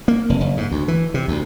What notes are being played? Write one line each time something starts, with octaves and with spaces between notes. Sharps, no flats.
A#3
F1
F#1
G#2
D2
E3
C3
D2